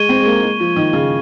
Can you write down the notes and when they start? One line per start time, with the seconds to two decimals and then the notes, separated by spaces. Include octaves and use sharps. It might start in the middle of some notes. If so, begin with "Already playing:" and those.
Already playing: G#3 C#6 G#6 D#7 G7
0.09 C4
0.20 G#3
0.25 A#3
0.42 G#3
0.60 F3
0.76 D#3
0.93 C#3